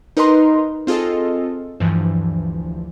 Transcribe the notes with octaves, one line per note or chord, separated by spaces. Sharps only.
D#4 A#4 B4 D#5 A#5 C6
C4 F4 G#4 A4 D#5
D2 G2 E3 F3